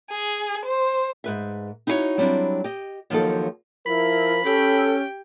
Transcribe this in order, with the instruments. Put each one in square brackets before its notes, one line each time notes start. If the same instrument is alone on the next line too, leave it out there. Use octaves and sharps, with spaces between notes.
[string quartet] G#4
C5
[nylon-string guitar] G#2 B4 E5
D#4 E4 F#4 A4 C#5
F#3 G3 C4 D4 E4
G4 D#5
D#2 F3 F#3 D#4 A4
[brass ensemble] F3 A#4 [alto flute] E4 [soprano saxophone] B5
[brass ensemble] C#4 [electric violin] G4 G5 [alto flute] A4